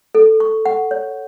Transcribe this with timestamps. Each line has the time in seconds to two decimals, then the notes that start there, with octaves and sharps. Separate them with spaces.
0.15 A4
0.40 C#6
0.65 F#5
0.91 C#5